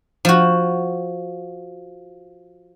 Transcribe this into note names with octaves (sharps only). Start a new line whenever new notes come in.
F3 F#4